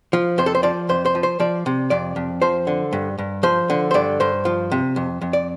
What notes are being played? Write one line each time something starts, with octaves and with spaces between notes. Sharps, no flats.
F3
F2 C5
A4
C5
F3 D5
F2 C5
C5
F3
C5
F3 D5
C3
F2 D5
F2
F3 C5
D3
G2
G2
F3 C5
D3
C5
G2 D5
G2 C5
F3
C3
F2
F2
D5